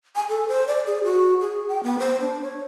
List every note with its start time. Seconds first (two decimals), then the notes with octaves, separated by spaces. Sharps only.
0.15 G#5
0.29 A4
0.48 C5
0.67 D5
0.87 G#4
1.04 F#4
1.41 G#4
1.68 G5
1.83 B3
1.99 C5
2.21 D4
2.42 C#5